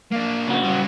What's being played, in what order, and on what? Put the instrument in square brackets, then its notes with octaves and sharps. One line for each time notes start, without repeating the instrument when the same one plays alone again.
[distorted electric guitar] A#3 D4
[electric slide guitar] C#3 F#4
[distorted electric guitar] G3 C#4